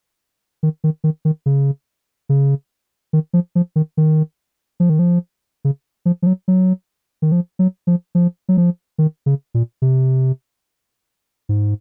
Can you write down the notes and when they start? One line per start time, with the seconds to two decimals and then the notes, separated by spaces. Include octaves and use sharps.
0.63 D#3
0.84 D#3
1.04 D#3
1.25 D#3
1.46 C#3
2.29 C#3
3.13 D#3
3.33 F3
3.55 F3
3.76 D#3
3.97 D#3
4.80 F3
4.90 D#3
4.99 F3
5.65 C#3
6.05 F3
6.22 F3
6.27 F#3
6.48 F#3
7.22 D#3
7.32 F3
7.59 F#3
7.87 F3
8.15 F3
8.49 F#3
8.57 F3
8.98 D#3
9.26 C#3
9.54 A#2
9.82 C3
11.49 G#2